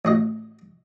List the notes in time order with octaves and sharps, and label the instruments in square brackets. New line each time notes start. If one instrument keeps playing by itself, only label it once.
[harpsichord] A1 F#4 D#5